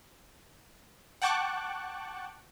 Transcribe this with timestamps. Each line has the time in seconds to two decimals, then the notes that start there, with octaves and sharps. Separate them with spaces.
1.22 F#5 G5 A5 C#6 D6 F#6